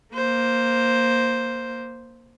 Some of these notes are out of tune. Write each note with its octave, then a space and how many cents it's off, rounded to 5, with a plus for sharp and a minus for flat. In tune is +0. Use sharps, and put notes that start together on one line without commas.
A#3 +0 C5 +0